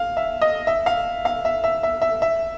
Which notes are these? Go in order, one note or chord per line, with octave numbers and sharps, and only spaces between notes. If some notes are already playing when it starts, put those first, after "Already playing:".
Already playing: F5
E5
D#5
E5
F5
F5
E5
E5
E5
E5
E5